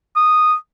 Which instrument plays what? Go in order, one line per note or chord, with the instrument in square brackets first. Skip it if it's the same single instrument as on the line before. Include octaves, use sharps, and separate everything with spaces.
[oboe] D#6